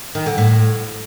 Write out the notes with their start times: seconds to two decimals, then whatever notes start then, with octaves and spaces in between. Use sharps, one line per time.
0.15 D#3
0.26 D3
0.38 A2